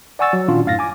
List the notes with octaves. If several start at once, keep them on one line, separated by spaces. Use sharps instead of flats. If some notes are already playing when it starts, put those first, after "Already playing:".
D5 F#5 G#5 C#6 E6 A6
F#3
A#2 D#3 C#4 D4 F4
F#2 A2 F5 A6 A#6
G#5 D6